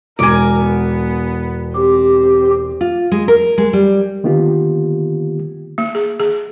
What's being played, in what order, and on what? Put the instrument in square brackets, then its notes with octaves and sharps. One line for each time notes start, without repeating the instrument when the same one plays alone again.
[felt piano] E1 [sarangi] A#4 [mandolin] G#5 D6
[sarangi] B3
[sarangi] C4 [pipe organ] G4
[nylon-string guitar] F4
G#3
A#4
G#3
G3
[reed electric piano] D3 D#3 A#3 B3 F4 G4
[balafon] A#3
G#4
G#4